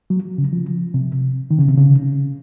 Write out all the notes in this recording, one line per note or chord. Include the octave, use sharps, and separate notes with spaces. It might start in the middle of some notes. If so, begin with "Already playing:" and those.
F#3
C#3
F3
C3
D#3
C#3
C3
C#3